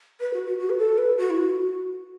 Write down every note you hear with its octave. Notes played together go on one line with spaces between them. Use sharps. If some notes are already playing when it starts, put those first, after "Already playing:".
B4
F#4
F#4
F#4
B4
A4
B4
F#4
E4
F#4